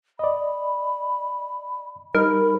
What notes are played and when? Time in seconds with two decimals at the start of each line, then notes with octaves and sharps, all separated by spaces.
0.19 D5 D#5 B5
2.15 G3 D#4 A#4 B5